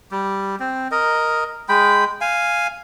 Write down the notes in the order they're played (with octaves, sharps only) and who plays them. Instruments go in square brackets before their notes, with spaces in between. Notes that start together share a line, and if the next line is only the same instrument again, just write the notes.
[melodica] G3
C4
A#4 D#5
G#3 G5 B5
F5 G#5